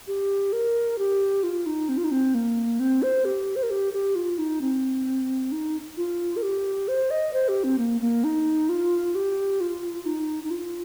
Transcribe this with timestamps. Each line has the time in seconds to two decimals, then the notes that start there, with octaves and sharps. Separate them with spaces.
0.07 G4
0.53 A#4
0.98 G4
1.43 F4
1.66 D#4
1.89 C4
1.97 F4
2.04 D#4
2.11 C4
2.34 A#3
2.80 C4
3.03 C5
3.25 G4
3.56 C5
3.63 A#4
3.71 G4
3.93 G4
4.15 F4
4.38 D#4
4.61 C4
5.52 D#4
5.97 F4
6.37 A#4
6.43 G4
6.88 C5
7.11 D#5
7.33 C5
7.48 G4
7.64 C4
7.78 A#3
8.01 A#3
8.24 D#4
8.69 F4
9.15 G4
9.61 F4
10.06 D#4
10.44 D#4
10.51 F4